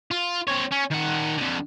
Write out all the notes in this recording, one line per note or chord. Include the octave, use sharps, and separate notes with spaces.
F4
C4 C#5
C#4
D#3 F#5
F2 D3